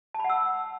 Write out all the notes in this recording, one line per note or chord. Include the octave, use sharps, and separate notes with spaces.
A5
B5
F#5
E6